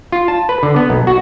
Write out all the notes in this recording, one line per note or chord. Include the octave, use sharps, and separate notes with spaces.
F4
A5
B4
D3
B3
B1
F#4